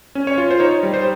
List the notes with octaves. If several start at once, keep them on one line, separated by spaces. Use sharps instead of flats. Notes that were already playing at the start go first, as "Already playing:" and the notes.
C#4
C#5
F4
C5
D#4 C#5
G3
C5